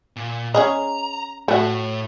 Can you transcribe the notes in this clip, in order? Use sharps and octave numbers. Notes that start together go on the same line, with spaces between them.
A#2
C#4 G#4 D#5 A#5
A2 A3 F#4